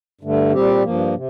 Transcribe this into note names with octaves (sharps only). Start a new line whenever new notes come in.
G2 D3 A3
A#2 G3 C4 G4
G2 F3 A#3
C3